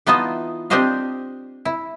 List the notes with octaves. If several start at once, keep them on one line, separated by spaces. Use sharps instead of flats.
E3 B3 D#4 F4 D#5 A5
C4 D4 G4 C5 D#5 F5
E4